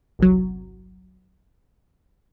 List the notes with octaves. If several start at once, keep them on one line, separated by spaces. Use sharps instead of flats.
G1 C2 F#3